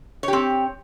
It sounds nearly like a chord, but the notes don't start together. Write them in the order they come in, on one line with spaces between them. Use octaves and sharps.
C#5 G4 C4